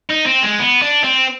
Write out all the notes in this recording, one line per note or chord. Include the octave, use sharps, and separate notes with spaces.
D#4
C4
G#3
B3
D4
C4